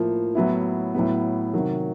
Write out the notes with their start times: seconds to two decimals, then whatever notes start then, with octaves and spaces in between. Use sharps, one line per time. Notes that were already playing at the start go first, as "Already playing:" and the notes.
Already playing: A2 F3 A#3
0.35 A2 F#3 B3 E4
0.94 A2 F#3 B3
1.54 C3 D#3 F#3